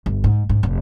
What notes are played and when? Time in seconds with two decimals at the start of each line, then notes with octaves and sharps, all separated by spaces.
0.06 G1
0.24 G#2
0.49 G#2
0.63 F1